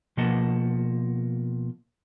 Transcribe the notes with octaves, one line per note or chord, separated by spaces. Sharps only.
B2 F3 A#3 D#5 F#5 A5